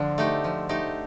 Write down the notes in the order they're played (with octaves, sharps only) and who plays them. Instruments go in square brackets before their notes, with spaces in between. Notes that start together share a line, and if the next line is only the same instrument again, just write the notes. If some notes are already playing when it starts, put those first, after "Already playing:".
Already playing: [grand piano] D3 D4 [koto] F3
[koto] A3 D#4 G4
F3
A3 D#4 G4